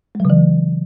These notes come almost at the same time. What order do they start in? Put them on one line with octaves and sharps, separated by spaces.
G#3 F#3 C#3 E3